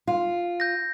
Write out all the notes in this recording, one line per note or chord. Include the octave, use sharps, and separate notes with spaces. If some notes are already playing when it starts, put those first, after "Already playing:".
F4
G6 A#6